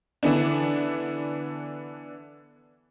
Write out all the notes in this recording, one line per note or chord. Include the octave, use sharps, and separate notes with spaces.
D3 E3 B3 D4